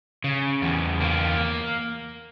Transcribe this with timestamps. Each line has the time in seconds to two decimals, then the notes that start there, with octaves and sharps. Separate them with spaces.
0.24 C#3
0.62 E2
1.01 A#3